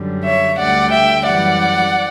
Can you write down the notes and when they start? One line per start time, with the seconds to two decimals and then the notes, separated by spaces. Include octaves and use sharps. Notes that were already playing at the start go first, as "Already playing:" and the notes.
Already playing: F#2 D3 G3
0.24 C#5 E5
0.58 D2 D3 G3 D5 F#5
0.92 E5 G5
1.26 F#2 E3 G3 D5 F#5